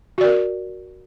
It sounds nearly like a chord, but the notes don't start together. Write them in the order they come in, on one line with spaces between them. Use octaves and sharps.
F#4 D5 A#4